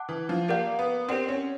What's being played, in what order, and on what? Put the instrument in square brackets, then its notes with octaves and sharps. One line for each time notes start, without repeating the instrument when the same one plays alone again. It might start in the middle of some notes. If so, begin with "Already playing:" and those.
Already playing: [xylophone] F#5 A5 D6 F#6
[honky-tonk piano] E3
F3
[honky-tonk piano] A#3 [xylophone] G4 A#4 D5 F#5
[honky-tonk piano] B3
[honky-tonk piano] C4 [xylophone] G4 A#4 D5 F#5
[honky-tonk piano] C#4